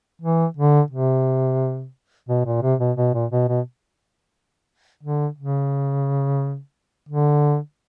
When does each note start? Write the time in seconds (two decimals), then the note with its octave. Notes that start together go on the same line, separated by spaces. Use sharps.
0.22 E3
0.57 D3
0.91 C3
2.29 B2
2.46 A#2
2.62 C3
2.80 B2
2.97 B2
3.14 A#2
3.32 B2
3.48 B2
5.03 D3
5.38 C#3
7.09 D3